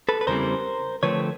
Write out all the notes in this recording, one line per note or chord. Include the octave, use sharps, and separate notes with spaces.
A4 B4
B4
E2 C#3 E3 G3 C4 A#4 C5
D3 F3 A3 C4 B4 C#5